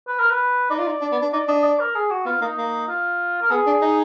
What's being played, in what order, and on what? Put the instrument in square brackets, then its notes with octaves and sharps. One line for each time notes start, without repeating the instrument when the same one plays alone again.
[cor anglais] B4
A#4
B4
[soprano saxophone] D#4 [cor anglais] D5
[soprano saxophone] F4
D#4
D4
B3
D4
[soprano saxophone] D#4 [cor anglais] D5
[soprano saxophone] D4 [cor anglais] D#5
[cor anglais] D5
A#4
G#4
F#4
[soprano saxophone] B3 [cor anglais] F4
[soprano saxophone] A#3 [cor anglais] D#4
[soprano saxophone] A#3
[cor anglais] F4
A#4
[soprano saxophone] B3 [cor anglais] G#4
[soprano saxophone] D4
D#4